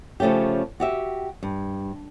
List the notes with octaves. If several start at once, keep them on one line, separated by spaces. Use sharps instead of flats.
C#3 F3 A3 C#4 G4
F#4 G4 E5
G2